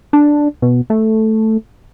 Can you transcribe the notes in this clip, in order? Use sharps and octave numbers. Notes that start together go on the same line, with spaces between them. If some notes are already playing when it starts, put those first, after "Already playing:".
D4
B2
A3